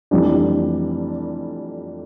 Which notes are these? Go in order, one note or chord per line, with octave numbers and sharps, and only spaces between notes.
F1 F2 E3 G3 D4